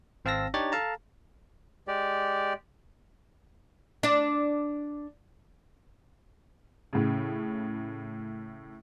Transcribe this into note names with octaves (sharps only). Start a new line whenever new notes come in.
G#1 C4 F5 A5 E6 A#6
D4 D#4 G4 C#5 A6
A4 F5 A5 A#5
G#3 G4 D5
D4 D5
A2 C#3